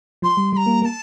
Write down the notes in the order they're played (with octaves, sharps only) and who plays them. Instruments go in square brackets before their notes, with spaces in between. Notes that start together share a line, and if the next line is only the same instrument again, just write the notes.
[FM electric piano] F3 [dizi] C6
[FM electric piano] G3
[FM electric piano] G3 [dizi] C6
[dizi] A#5
[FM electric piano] A#3
[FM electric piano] A#3 [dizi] A#5
[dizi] A5